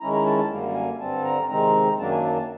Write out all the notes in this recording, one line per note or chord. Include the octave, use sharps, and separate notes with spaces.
D#3 G#3 C#4 E4 A#5
A#5
A5
A5
F#2 D3 G3 A#3
G#5
G2 D3 G3 C4 A5
A#5
C3 D#3 G#3 C4 D#4 A#5
F#2 D#3 F#3 A#3 D4 A5
G#5
A5
A5